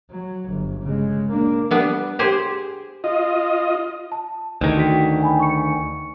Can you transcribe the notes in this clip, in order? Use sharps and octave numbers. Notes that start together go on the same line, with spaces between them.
F#3
G1
C#3 G#3
A#3 D4
G3 B3 D4
G4 G#4 C5
F4 D#5
A5
D2 D#3
F#4 G5 B6
G5 G#5 B5
C#6 C#7